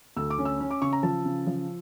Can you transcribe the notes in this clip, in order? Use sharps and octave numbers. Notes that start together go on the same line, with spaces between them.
D2 E6
D6
C#4
E6
C#4
D6
C#3 C#6
A#5
F3 A5
C#3
F3